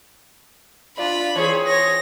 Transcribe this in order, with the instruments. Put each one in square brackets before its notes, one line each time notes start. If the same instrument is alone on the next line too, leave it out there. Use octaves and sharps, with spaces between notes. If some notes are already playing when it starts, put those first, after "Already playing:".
[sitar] D4 D5 [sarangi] F4 [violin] B5
[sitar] E3 C4 G#4 [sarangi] C#5
[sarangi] C#5 [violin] A#6